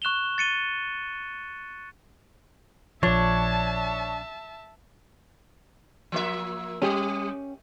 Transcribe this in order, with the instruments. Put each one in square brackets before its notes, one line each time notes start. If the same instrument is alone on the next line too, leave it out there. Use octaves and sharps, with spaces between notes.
[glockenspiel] C#6 F#6 E7 F7 G7
A6 C#7 D#7 G7
[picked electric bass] A#1 F3 [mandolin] D4 [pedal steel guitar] C#5 [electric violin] E5 A5
[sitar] F3 A#3 E5
[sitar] G3 [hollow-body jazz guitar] C#4 G4